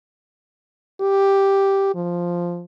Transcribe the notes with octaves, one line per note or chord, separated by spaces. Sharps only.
G4
F3